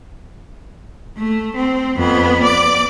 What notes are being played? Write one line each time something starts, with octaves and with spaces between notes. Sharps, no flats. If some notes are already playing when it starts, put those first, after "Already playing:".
A3
C4
F2 B3
D5